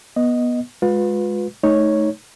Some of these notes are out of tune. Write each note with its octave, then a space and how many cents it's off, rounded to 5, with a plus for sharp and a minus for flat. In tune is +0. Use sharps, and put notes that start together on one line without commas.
B3 -20 D#5 +0
G#3 +0 F4 +40 B4 +0
A3 -20 D#4 +10 C#5 +0